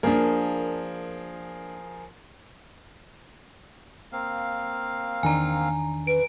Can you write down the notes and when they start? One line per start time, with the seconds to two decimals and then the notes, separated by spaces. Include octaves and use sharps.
0.03 F3 A#3 D4 G#4 A#4
4.12 A#3 C4 F5
5.23 E2 D#3 D4 G#5 A#5
6.07 B4 D7